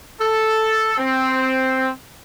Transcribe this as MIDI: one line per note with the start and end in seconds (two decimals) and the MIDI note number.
0.21 0.96 69
0.98 1.90 60